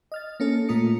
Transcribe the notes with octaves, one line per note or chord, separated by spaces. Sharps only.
D#5 F6 A6
A#3 C#4 A4
A#2 A3 F4 D#6 C#7